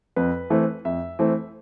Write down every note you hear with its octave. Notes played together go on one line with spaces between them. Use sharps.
F2 B4
E3 A3 C4
F2 E5
E3 A3 C4